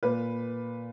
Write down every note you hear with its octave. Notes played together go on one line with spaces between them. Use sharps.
A#2 B4